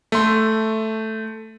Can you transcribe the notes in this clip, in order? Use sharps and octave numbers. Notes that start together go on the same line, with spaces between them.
A3 C6